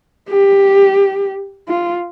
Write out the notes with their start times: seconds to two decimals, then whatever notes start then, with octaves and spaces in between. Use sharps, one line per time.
0.29 G4
1.68 F4